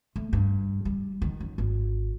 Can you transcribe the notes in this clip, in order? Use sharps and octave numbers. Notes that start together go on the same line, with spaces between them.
A3
G2
G3
D#3
F#2
G#1